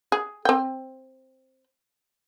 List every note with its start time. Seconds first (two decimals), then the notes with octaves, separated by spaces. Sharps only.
0.12 G#4
0.45 C4 G5